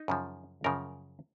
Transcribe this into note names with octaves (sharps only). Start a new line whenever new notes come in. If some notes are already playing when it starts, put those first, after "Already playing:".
Already playing: D#4
F#2 C#3 F3
F#2 C#3 F3 A#4